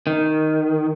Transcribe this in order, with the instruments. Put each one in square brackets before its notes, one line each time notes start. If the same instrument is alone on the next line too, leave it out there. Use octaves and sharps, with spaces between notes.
[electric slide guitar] D#3